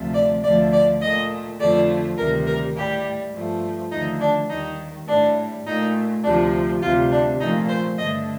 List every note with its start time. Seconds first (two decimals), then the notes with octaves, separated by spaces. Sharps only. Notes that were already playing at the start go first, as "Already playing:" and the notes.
Already playing: D2 C3 F3 A3
0.14 D5
0.43 D2 D3 F3 A3 D5
0.72 D5
1.01 A#2 A3 D#5
1.59 F2 D3 F3 A3 D5
2.17 D2 C3 D#3 G3 A#4
2.46 A#4
2.75 A2 G3 G4
3.33 G2 F3 A3
3.91 D#2 D3 F3 A3 D#4
4.20 D4
4.48 D#2 D#3 G3 D#4
5.07 A2 G3 D4
5.65 A#2 A3 D#4
6.23 D2 C3 F3 D4
6.81 D2 C3 G3 F4
7.10 D4
7.39 A#2 F3 A3 D#4
7.68 C5
7.97 G2 D3 A3 D#5